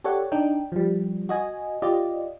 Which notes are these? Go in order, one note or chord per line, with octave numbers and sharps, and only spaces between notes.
G4 A4 C#5 D5 F#5
D4 D#4 G5
F3 G3
F#4 D#5 G#5
F4 G4 D5 D#5